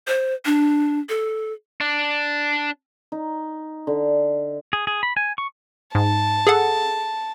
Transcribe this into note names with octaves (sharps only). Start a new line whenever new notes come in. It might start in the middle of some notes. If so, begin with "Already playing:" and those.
C5
D4
A4
D4
D#4
D3
G#4
G#4
B5
G#5
C#6
G#2 A5
G#4 A4 F#5